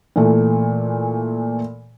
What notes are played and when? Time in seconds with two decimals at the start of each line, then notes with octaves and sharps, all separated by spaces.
0.16 A#2 E3 A3